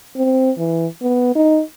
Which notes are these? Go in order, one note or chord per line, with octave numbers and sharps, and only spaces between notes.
C4
E3
B3
D#4